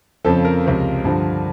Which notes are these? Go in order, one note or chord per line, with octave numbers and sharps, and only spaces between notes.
F2 C#3 F3 A4
A#4
C#2 C3 F3
G2 D3 F3